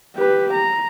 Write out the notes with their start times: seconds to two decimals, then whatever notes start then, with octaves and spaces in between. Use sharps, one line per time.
0.16 G4 B4
0.54 A#5